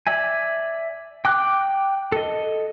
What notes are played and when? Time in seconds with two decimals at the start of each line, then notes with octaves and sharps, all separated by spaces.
0.07 D5 E5 G#5
1.25 G5 D6 F#6
2.12 A4 D#5